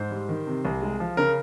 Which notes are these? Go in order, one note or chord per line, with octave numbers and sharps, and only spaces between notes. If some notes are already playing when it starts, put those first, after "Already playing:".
Already playing: G#2 C5
G3
D#3
C3
C2
G#3
F3
C#3 A#4